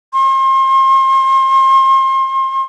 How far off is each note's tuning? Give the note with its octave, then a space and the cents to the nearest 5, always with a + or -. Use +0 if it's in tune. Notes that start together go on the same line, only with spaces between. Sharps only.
C6 +35